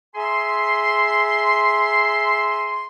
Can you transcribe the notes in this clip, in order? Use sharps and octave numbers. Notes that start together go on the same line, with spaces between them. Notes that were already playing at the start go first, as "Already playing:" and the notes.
G#4 E5 G#5 A#5 C6